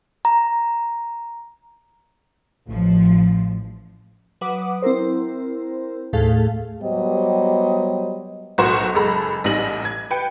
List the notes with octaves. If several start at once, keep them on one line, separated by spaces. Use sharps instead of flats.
A#5
A1 F3
F#3 B4 F#5 D6 D#6
C4 E4 A#4 C5
D#2 A2 A3 G#4 A4 F5
F#3 G3 B3 G4 C5 D#5
B1 A2 F#4 A#4 C5 C#6
F#1 G#3 A4 A#5 B5
A1 G3 D#4 A#6 F#7
G#6
B4 G5 C#7